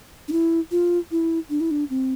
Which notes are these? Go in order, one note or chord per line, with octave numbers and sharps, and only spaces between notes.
D4
E4
F4
E4
D4
E4
D4
C4